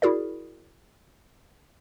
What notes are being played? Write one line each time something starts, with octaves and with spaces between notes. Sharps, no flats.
E4 F#4 G#4 A#4 D5